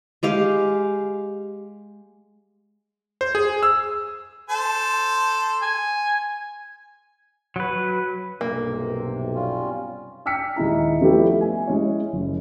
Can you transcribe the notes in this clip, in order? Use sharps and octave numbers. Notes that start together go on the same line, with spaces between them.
G#3 G4 F5
C5
G#4
E6
A4 C5 A5
G#5
F#3 B4
B1 G2 C3 A#3
G3 C#4 F4
G5 E6 F6 B6 C#7
D#1 G#3 D#4 E4 A#5
F3 G3 A3 B3 E4 G4
G#5
G#3 C#4 E4 C#5
F#1